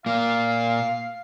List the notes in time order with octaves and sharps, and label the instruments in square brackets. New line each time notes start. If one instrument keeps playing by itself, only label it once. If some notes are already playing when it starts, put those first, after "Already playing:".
[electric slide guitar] A#2 A#3 [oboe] F5